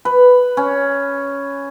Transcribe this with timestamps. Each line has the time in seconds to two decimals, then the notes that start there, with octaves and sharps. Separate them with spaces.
0.05 B4
0.57 C#4